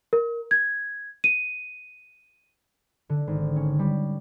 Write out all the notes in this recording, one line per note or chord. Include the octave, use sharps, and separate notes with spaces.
A#4
G#6
D#7
D3
G#1
C#4
G3